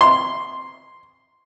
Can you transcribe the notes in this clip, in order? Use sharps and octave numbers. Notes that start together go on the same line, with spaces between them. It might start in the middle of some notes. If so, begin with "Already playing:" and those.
C6